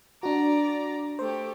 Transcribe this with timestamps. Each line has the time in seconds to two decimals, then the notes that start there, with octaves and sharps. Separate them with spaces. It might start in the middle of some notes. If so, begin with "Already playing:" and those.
0.23 D4 F#4 D5 A#5
1.19 A3 G4 C5